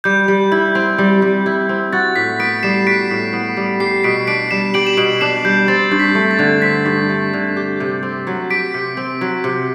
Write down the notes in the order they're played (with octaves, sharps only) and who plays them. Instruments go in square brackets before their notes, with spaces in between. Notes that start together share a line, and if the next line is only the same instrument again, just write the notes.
[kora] G3 [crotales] G6
[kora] G3
E4
C4
G3
G3
E4
C4
[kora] F#4 [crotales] A6
[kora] A2 [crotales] B6
[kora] B3 [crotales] B6 D7
[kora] G3 [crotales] C7 E7
[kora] F#4 [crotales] B6 D7
[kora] A2
B3
G3
[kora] G4 [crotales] C7
[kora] B2 [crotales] B6 D7
[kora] D4 [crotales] B6 D7
[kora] G3 [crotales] C7 E7
[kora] G4 [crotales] D7 F#7
[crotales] E7
[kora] B2 [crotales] D7 F#7
[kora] D4 [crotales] C7 E7
[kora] G3 [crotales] G6
[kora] C4 [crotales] A6
[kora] G2
[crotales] B6
[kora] A3
[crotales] A6
[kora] D3
[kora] C4 [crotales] B6
[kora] G2
A3
D3
G4
C3
C4
F#3
[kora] G4 [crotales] B6 D7
[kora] C3
C4
F#3
C3